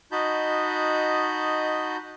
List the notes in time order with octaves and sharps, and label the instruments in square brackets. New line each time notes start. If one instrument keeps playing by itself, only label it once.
[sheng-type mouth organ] D#4 F#4 D#5 A5 B5 G6